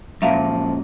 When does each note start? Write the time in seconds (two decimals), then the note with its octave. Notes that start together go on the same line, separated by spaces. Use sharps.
0.22 F#2 A#2 F3 E5 F5